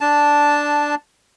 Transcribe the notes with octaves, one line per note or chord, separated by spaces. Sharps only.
D4 A5